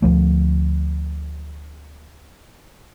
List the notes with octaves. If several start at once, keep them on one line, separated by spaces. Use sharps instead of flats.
D2 F3 A3